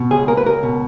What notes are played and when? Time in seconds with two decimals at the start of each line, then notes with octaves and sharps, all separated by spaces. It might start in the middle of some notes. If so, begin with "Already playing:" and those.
Already playing: B2
0.11 C#2 G#4
0.28 A#3 A#4
0.37 B4
0.46 C#2 A#4
0.63 B2